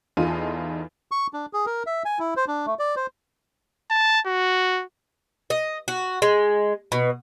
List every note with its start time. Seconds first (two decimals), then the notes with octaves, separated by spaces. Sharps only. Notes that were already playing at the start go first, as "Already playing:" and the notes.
0.17 E2 D#4 F4 A4 D#7
1.11 C#6
1.33 D4
1.53 G#4
1.66 A#4
1.86 E5
2.05 G#5
2.19 E4
2.36 C5
2.48 D4
2.66 A3
2.79 D5
2.96 C5
3.90 A5
4.26 F#4
5.50 D#5
5.88 F#4
6.22 G#3
6.92 B2